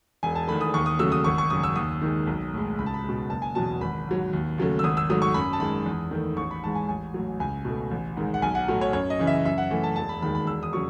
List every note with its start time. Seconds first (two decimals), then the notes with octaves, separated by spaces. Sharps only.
0.23 E1 G#5
0.35 A5
0.48 E2 D#3 A3 B5
0.61 D#6
0.74 D#2 C#6
0.86 D#6
0.99 C#3 F#3 A3 E6
1.12 D#6
1.24 G#1 C#6
1.38 C#6
1.50 F#2 C#3 D#6
1.63 E6
1.76 D#2 D#6
2.02 D#3 G#3
2.27 B1
2.54 A2 G#3
2.79 C#2 B5
2.86 A5
2.94 B5
3.04 B2 G#3
3.30 F#1 A5
3.42 G#5
3.55 E2 B2 F#3 A5
3.81 G#1 B5
4.07 G#2 F#3
4.33 D#2
4.58 C#3 F#3 A3
4.79 E6
4.83 G#1 D#6
4.97 E6
5.10 G#2 F#3 A3 D#6
5.22 C#6
5.34 F#2 B5
5.53 A5
5.60 D#3 G#3 B5
5.86 E2
6.11 D#3 A3
6.37 A1 C#6
6.51 B5
6.63 G#2 E3 G#3 A5
6.75 G#5
6.89 A1 G#5
7.14 A2 F#3
7.40 C#2 G#5
7.65 B2 A3
7.91 A1
8.17 G#2 D#3 G#3
8.34 F#5
8.42 B1 G#5
8.55 F#5
8.68 A2 F#3 A3
8.81 C#5
8.93 F#2 C#5
9.10 D#5
9.19 C#3 E3
9.27 E5
9.45 F#2 E5
9.58 F#5
9.70 E3 A3
9.84 A5
9.96 E1 A5
10.09 B5
10.22 D#2 D#3 G#3 B5
10.35 B5
10.47 E1 E6
10.63 D#6
10.73 C#3 F#3 C#6